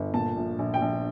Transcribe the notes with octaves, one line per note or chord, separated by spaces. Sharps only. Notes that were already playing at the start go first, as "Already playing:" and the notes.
Already playing: G1
A#2 A5
A#1
A#1
G5
A#1